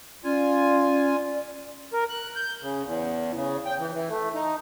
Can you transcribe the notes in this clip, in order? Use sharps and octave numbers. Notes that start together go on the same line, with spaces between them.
C#4 F4 D5 G#5
A#4
F#6
G6
C#3
E2
C#3
G5
E3
E3
A3
D#4